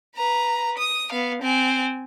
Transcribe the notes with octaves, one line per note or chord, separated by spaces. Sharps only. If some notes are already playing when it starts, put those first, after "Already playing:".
B4 A#5
D#6
B3 F5
C4 G#5